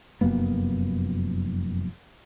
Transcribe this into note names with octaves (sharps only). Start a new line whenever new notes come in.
F1 F#2 A#3 B3